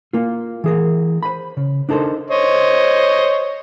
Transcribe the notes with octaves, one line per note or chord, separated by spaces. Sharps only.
A#3 F4
E3 G#4 A#4
C5 B5
C#3
D4 D#4 A4 A#4 C5
C5 C#5 D#5